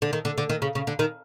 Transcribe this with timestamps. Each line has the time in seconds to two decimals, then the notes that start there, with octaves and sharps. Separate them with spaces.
0.02 D3
0.13 D#3
0.25 D3
0.38 D3
0.50 D#3
0.62 C#3
0.75 C#3
0.87 D3
0.99 D#3